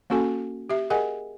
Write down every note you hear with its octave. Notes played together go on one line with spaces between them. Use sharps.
A#3 C#4 F#4 A4 G#5
G4 E5
G#4 A#4 D#5 F#5 G#5